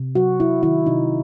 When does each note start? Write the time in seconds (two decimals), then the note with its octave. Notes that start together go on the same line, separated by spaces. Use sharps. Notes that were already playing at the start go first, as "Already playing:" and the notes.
Already playing: C3
0.15 F#3 F#4
0.40 C3 E4
0.63 D#3 E4
0.86 C3 D#4